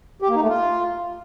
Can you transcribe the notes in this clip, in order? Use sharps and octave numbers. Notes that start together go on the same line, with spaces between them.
G4
A#3
D#4
A3
F4